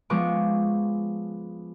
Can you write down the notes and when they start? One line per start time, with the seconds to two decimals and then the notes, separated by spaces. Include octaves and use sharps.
0.10 F3 G#3 B3 C#6 D6